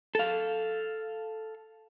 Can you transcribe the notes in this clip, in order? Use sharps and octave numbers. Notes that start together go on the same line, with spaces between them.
A4 F5